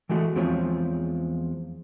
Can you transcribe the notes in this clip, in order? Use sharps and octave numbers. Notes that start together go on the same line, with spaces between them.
E3 G#3 A3 F#4
E2 F3 G#3 C4 F4 C#5